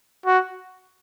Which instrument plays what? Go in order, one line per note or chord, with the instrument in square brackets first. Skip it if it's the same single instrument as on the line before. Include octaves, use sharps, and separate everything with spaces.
[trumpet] F#4